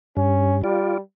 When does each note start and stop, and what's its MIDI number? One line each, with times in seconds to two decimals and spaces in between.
0.17 0.63 43
0.17 0.58 61
0.64 1.01 55
0.64 0.98 65
0.64 0.98 74